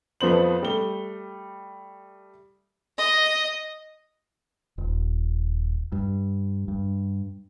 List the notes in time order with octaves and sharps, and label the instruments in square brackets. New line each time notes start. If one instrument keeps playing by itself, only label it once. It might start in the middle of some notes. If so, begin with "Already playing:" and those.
[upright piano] F2 F3 B3 C5 F#7
G3 A3 G7
[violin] D#5
[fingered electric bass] D#1
G2
G2